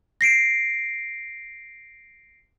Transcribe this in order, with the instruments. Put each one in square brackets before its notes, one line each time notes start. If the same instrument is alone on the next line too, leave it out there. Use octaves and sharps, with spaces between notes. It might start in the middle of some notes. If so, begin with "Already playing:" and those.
[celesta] A#6 C7 D7